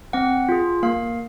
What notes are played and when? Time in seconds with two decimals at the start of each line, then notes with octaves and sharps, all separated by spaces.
0.13 C4 F#5
0.49 F4 G#4
0.83 A#3 F5